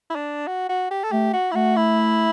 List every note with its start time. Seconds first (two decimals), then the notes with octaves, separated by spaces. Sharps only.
0.10 E4
0.16 D4
0.47 F#4
0.69 F#4
0.91 G4
1.04 A4
1.12 A3 G4
1.33 F#4
1.51 E4
1.55 A3 F#4
1.76 E4